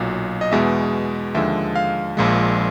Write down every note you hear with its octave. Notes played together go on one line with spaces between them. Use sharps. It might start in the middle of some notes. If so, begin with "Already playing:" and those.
Already playing: B1 A#2 F#3
D#5
E2 B2 G#3 E5
D#2 D3 F3 G#3 E5
F5
A#1 A#2 F3 G#3